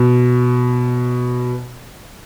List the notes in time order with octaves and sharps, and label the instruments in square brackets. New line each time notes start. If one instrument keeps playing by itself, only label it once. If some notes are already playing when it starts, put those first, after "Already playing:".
Already playing: [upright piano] B2